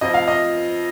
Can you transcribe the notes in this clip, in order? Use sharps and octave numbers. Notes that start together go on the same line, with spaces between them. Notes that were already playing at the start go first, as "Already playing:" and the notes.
F2 F3 D#5
F5
D#5